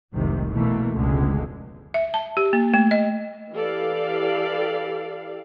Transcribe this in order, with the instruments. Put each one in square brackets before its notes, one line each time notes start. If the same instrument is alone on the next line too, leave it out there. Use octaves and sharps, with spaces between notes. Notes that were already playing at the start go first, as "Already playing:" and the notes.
[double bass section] F1 C2 G#2 C3 D#3
B2 E3 A3 A#3
F1 C#2 B2 D3 G#3
[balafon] E5
A5
G4
A#3
A3
D#5
[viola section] E3 G4 A4 D5 F5